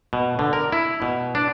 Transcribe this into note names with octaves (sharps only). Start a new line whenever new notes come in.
B2
D3
A#4
E4
B2
D4